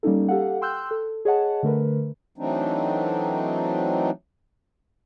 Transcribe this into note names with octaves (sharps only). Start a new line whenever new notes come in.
G3 A#3 C#4 D#4 A4
G4 A4 F5 F#5
G5 C6 E6 F#6 G6
A4
G#4 C#5 D#5 F#5 A5
D3 A3 A#4 B4
E3 F#3 A3 C4 D4 D#4